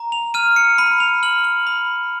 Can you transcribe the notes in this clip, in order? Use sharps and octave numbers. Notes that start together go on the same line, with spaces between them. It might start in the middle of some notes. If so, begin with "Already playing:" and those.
Already playing: A#5
F7
F6 D#7
C#7
B5 D#7
F7
F6 F#7
F#7
B5